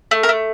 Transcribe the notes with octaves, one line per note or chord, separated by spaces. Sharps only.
A3
A#4
A3